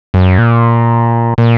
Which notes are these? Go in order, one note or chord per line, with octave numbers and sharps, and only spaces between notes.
F#2
A#2
A#2